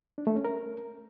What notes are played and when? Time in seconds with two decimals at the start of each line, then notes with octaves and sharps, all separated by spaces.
0.18 D4
0.27 A3
0.36 C#4
0.45 A#4